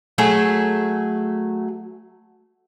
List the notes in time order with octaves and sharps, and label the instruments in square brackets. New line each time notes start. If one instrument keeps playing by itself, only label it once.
[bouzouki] F#3 A3 G#4 A4